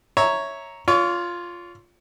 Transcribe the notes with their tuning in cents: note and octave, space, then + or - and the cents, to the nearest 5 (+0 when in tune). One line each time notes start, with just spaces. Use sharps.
C#5 +0 E5 -10 A#5 +0
F4 +0 C#5 +35